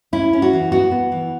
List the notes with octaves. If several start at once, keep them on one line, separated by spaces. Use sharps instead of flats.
C#4 E4
C#4
F#4
E3
B3 F#4
B3
E3